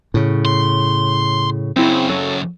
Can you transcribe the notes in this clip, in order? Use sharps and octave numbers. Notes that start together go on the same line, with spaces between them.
A2 C#3
C6
F#2 C#3 C4 E4 G#4
F#3 A4